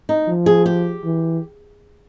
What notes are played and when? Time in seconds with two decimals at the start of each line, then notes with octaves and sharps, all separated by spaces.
0.09 D#4
0.27 F3
0.46 G#4
0.66 G4
1.05 E3